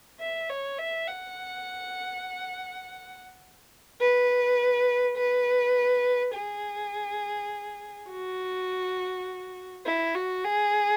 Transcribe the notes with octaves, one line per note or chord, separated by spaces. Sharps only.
E5
C#5
E5
F#5
B4
B4
G#4
F#4
E4
F#4
G#4